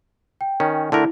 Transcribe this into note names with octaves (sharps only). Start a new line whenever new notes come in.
G5
D#3 C#4
D3 A3 E4 A#4